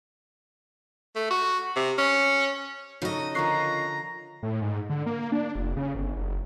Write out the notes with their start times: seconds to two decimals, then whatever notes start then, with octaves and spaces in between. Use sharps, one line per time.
1.16 A3
1.31 F#4
1.76 C3
1.98 C#4
3.02 C#3 D#4 F#4 A4 D#5
3.35 D3 F3 A#4 A#5 C#6 F#6 C7
4.43 A2
4.61 G#2
4.90 D3
5.06 A#3
5.32 D4
5.55 F1
5.77 C#3
5.95 G1
6.17 F#1